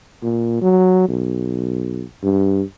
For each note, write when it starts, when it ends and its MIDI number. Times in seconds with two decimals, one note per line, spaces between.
0.23 0.56 46
0.62 1.07 54
1.09 2.05 35
2.23 2.63 43